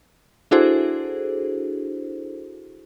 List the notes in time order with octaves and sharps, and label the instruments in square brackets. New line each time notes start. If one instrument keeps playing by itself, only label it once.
[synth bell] D4 E4 F#4 G#4 A4 C5